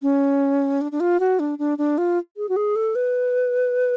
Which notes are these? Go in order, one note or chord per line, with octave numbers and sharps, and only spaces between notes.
C#4
D4
D4
F4
F#4
D4
D4
D4
F4
G#4
F#4
G#4
A4
B4